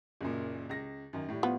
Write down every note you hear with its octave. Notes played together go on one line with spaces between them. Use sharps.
F#1 F#2 A#2
C#2 A#6
F#2 D#3
A2 G3
F3 B3